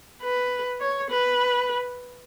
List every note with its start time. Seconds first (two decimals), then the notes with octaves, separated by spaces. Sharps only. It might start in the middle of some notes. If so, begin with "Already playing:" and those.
0.22 B4
0.80 C#5
1.10 B4